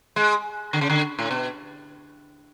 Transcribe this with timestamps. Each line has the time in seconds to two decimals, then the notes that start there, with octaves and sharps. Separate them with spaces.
0.16 G#3
0.73 D3
0.81 C#3
0.90 D3
1.19 A2
1.31 B2